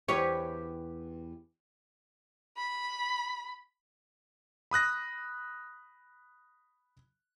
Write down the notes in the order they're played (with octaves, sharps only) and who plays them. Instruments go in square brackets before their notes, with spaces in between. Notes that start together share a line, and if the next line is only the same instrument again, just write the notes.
[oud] E2 C#5 [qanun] G4 B4
[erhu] B5
[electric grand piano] B5 D#6 F#6 A#6